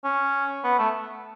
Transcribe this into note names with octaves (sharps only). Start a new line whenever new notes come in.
C#4
B3
A3